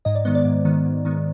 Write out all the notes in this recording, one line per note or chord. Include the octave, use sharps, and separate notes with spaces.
G#2 D#5
D5
D#3 G#3 B3 C5
D5
G#2
D#3 G#3 B3
G#2
D#3 G#3 B3